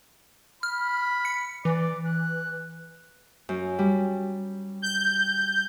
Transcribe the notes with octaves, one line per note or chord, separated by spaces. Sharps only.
B5 F6
C#7
E3 D5
F#6
F#2
G3
G6